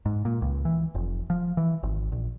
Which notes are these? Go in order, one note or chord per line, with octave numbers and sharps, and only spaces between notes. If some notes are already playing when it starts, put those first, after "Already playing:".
G#2
A#2
C#2
E3
F1
F3
E3
G#1
A#1